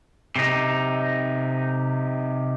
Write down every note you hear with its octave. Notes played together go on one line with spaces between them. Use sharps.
C3 D#4